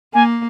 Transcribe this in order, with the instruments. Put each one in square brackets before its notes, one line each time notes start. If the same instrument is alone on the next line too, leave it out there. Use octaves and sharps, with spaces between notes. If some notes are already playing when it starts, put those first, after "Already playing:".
[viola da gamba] A#3 [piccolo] G#5